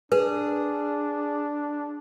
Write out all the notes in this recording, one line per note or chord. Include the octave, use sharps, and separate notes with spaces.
D4 G#4 B4